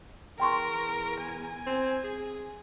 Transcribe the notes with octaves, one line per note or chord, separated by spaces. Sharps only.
E2 A#4 G5 C6 C#6
G#5
C4
G#4